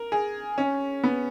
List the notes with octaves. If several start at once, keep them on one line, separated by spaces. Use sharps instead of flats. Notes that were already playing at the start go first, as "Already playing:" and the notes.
Already playing: A#4
G#4
C#4
B3